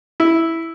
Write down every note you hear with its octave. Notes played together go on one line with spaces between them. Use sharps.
E4